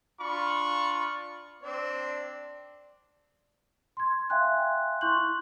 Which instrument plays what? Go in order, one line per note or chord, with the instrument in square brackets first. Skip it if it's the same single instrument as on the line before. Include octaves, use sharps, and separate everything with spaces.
[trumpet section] D4 F4 B5 C#6
[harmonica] C4 D4 D5
[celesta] C6 G#6
E5 F5 G5 G#5 C6 F#6
E4 C6 C#6 F#6 G6 F#7